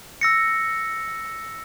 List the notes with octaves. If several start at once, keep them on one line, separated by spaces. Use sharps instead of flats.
E6 A#6 C#7